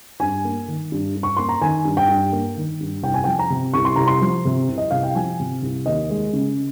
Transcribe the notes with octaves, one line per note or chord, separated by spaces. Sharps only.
G2 G#5
A#3
D#3
G2
G2
C#6
A#3 C6
A#5
D#3 G#5
G2
G5
G2
A#3
D#3
G2
C2 G5
G#5
G5
F3
A#5
C3
C2 C#6
C6
C2 A#5
C6
F3
C3
C2
D#5
C2 F5
G5
F3 G#5
C3
C2
D#2 D#5
G#3
C#3